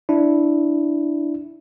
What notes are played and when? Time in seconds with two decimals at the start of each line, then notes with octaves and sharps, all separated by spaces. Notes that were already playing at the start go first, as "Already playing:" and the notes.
0.09 D4 E4